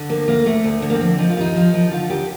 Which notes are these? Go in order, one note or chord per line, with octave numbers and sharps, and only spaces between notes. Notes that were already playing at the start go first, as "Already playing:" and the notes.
Already playing: D3
D2 A#3
D2 A#3
D2 A3
D2
D3
A#3
C4
F3
F3 D#4
F4
D#2 D#4
F3
F3
D3 F4
D#2 G4